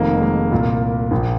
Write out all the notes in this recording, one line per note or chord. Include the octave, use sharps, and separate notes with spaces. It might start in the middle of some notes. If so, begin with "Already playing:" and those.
Already playing: F1 F2 D#3 A#3
G#3
A#3
C2 A#2
A#1
A#2